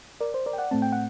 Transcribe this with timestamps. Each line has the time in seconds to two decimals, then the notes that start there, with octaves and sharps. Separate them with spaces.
0.21 A#4 D5
0.34 C5
0.46 A#4 D5
0.53 G5
0.58 D5 F#5
0.71 A2 A3 C4 A5
0.82 G5
0.92 F#5